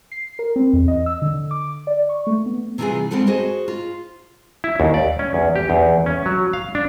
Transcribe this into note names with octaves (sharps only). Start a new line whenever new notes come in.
C7
A#4
C4
E2
D#5
E6
D3
D6
D5
C#6
A3
B3
C3 E3 G3 B3 F4 G#4
G3 G#3 C4 F4 A4 F#5
F#4 G#4 C5 D#5
F4
E4
D#2
D5
C#4
E2
G4
E2
C#4
F#3
F5
D4